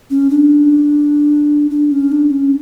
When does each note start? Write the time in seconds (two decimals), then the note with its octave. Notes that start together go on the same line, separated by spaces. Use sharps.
0.10 C#4
0.30 D4
1.71 D4
1.92 C#4
2.12 D4
2.31 C#4